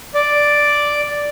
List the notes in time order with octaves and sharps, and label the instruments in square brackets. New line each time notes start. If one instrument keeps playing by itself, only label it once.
[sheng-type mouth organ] D5